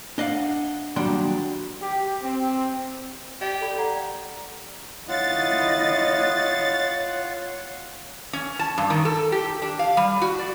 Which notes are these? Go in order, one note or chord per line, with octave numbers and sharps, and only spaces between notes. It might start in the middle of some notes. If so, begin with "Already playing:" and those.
D4 D#5 F5 F#5
D#2 F#3 G3 D4 D5 C6
G4
C4
G4 D5 D#5 D6
A4 D5 B5
D5 F#5 A#5
E4 F4 C#5 D#5 F#5 A6
C#4
A5
G2
D#3
A4
G4
D4
F5
G3
F#4
D5